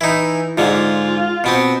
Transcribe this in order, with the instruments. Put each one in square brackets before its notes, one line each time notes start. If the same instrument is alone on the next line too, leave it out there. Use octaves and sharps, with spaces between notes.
[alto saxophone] E3 [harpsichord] D#4 E4
[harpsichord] G#2 D3 G#3 [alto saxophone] F4
[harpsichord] B2 B3 C4